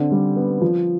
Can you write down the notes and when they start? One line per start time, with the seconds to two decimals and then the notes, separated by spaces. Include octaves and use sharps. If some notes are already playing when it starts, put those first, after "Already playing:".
Already playing: D3 C4
0.12 G3
0.36 B3
0.62 F3